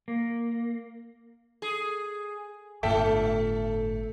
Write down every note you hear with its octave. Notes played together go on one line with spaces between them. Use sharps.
A#3
G#4
G1 A2 A3 A4 E5 G5